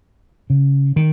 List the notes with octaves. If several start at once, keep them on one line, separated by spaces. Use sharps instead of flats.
C#3
D#3